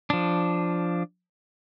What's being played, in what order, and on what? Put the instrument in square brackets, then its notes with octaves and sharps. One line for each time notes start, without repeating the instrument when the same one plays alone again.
[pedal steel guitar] F3 D4